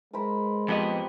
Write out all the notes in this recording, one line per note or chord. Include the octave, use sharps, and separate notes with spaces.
G#3 A#4 C5 B5
F2 F3 B3 G4 D#5 D6